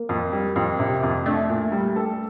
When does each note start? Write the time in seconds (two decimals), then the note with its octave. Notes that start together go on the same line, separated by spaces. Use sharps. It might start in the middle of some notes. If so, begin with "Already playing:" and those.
Already playing: A#3
0.09 F2
0.32 G3
0.56 F2
0.79 C3
1.03 F2
1.26 A3 D4
1.49 A#2
1.72 G3
1.96 A4